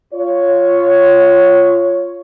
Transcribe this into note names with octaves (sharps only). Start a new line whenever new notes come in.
F4 C#5